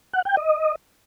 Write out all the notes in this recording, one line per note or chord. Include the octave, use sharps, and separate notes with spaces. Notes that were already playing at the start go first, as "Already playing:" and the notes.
F#5
G5
D#5